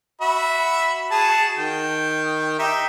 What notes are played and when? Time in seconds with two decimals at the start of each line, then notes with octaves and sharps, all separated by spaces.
0.21 F#4 E5 B5
1.11 F#4 G#4 A5
1.57 D#3 G5
2.59 D#4 G4 E5